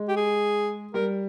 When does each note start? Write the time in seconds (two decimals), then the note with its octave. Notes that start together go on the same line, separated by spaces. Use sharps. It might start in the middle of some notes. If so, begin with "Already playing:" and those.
Already playing: G#3
0.08 G4
0.16 G#4
0.94 G3 A#4